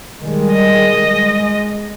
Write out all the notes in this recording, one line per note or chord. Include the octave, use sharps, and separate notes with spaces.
D#3 G3 G#3
D#5
G#3